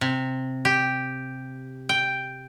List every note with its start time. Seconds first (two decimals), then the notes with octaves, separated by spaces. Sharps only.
0.01 C3
0.65 G4
1.89 G5